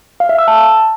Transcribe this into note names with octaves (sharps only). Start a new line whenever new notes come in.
F5
E5
E6
A5